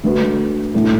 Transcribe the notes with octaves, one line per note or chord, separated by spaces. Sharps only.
D3 A3 F#4 B4
A2 A3 E4 A4